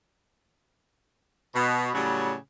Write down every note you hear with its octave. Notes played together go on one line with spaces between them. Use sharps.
B2
A2 C#3 F#3 G3